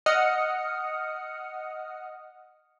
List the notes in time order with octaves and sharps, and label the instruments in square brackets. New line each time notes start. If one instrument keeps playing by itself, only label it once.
[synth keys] D#5 F#5 D#6 F6 C#7